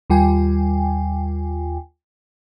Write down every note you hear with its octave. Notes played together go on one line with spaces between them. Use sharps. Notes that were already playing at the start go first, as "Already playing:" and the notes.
D#2 G3 F4 G5 G#5